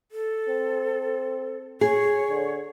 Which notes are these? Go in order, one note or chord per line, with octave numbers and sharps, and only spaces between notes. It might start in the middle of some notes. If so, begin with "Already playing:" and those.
A4
C4
G#4 C#5
D3